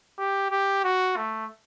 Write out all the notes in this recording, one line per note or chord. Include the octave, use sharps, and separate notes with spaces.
G4
G4
F#4
A3